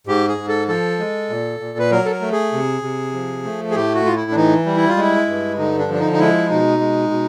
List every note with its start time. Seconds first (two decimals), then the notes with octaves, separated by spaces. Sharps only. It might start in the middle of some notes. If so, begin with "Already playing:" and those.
0.07 G#2 G4
0.28 G#4
0.38 G#2
0.48 A4
0.68 F3 A4
0.99 G#3
1.30 A#2
1.60 A#2
1.79 B4
1.91 F#3 A#4
2.05 A4
2.11 A#4
2.21 A3
2.32 G#4
2.53 C3
2.82 C3
3.13 F3
3.44 A3
3.71 G#4
3.74 A2 G4
3.94 F#4
4.05 A2 F4
4.16 E4
4.31 D4
4.36 E3 D#4
4.66 G3
4.77 E4
4.88 F4
4.97 G#3 E4
5.27 G2
5.58 D3 D#4
5.79 D4
5.88 F3
5.94 D4
5.99 D#4
6.13 D#4
6.19 G#3 E4
6.49 B2 D#4
6.80 G#3
7.11 B2